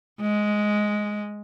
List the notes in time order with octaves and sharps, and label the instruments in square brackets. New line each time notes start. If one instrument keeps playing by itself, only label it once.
[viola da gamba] G#3